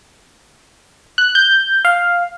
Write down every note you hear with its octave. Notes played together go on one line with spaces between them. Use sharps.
F#6
G6
F5